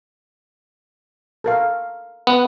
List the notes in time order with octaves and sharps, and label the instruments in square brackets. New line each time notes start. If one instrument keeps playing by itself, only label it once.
[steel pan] A4 A#4 F5
[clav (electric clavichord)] B3 [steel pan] F#5